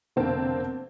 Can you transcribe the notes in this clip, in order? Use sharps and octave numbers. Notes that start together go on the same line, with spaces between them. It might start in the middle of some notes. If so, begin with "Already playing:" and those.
F1 B2 D3 A#3 C4 A5